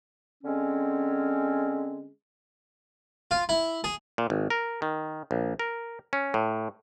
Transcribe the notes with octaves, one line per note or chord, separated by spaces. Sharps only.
D3 G#3 C4 C#4
F4
E4
G#4
A#2
G#1
A#4
D#3
A#1
A#4
C#4
A2